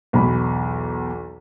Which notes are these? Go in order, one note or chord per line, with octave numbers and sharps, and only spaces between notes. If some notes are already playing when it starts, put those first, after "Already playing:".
B1 E2 B5